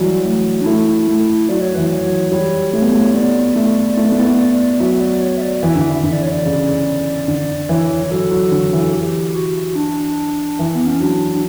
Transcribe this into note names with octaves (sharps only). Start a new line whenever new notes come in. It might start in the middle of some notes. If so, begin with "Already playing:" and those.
Already playing: E3 F#3 G3
A3
D4
A3 E4
A3
F#3 D5
C#5
E3 B4
C#5
F#3
G3 C#5
A3 C#5
B3
A3
B3 D5
A3
A3
B3
A3
B3
A3
D5
F#3 E5
E5
D5
C#5
E5
D5
E3 E5
D3
E3
D3 E5
D5
C#5
D5
C#3
D3 D5
E3 C#5
E3
F#3 A4
F#3
D3
E3
G4
F#4
D4
E3
B3
C#4
F#3 D4
D4